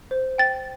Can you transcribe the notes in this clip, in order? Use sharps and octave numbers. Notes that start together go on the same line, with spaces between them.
C5
G5 A6